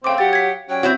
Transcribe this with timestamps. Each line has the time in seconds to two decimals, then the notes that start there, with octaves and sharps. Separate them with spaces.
0.04 C#3 A3 C4 F5 G5 D6
0.18 F#3 G4 F#5 G5 A6
0.33 G#6 B6
0.70 F#3 G3 C#4 G5
0.83 C4 E4 F#4 C#5